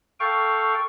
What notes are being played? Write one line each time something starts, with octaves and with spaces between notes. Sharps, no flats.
A4 F5 G5 C#6